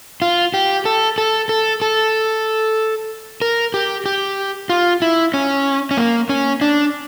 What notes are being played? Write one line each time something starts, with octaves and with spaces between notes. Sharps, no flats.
F4
G4
A4
A4
A4
A4
A#4
G4
G4
F4
E4
C#4
C#4
A#3
C#4
D4